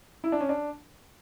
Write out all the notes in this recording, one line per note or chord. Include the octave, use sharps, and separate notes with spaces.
E4
D4
C#4
D4